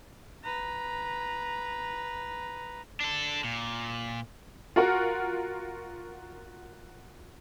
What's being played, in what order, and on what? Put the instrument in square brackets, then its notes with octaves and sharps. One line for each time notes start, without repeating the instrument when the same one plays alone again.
[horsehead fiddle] B4 A#5
[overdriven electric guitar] D4 A4
A#2
[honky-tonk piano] F4 F#4 A#4 F#5